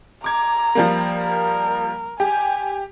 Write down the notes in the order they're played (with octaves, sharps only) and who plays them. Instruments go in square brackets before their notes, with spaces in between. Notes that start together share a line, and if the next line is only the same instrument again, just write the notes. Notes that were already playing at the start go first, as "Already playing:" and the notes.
[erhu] A#5 [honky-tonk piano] D6 G#6
[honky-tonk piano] F3 G3 A#3
[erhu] A#4
[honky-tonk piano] G4 [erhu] G#5